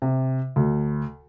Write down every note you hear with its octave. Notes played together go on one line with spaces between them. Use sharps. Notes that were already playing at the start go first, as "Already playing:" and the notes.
C3
D2